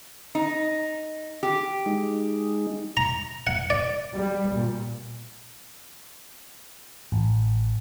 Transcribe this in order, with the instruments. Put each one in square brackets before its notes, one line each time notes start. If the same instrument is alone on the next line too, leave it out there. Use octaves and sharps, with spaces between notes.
[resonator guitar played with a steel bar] D#4
G4
[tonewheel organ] G#3 D#4
[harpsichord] A#5
F#5
D5
[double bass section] G3
A#2
[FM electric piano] A1